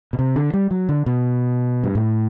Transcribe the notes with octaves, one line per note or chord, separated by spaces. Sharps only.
B2
C3
D3
G3
F#3
D3
B2
G2
A2